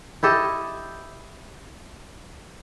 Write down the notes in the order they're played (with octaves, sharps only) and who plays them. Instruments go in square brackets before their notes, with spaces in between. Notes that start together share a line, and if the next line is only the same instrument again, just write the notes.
[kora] E4 G4 A4 D#5